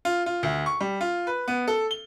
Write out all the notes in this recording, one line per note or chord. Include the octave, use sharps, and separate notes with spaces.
F4
F4
D2
C#6
G3
F4
B4
B3
A4
G7